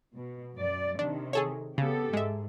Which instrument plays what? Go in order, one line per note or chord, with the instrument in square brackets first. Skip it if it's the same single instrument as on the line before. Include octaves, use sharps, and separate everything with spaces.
[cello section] B2
F#2 D5
[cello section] C3 D#3 [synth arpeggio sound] D4
[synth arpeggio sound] G#4 A4 C#5
[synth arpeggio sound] C#3 [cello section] B3 G4 A4
[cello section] G#2 [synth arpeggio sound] G#3 E5